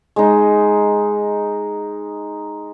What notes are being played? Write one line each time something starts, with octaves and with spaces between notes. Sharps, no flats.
G#3 D#4